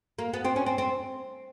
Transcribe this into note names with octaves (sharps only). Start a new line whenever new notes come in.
A#3
B3
C4
C#4
C4
C4